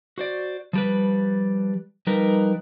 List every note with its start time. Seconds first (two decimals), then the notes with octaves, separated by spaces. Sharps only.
0.18 F#4 C5 D5
0.73 F3 G3 B4
2.07 F3 G3 D#4 A#4 B4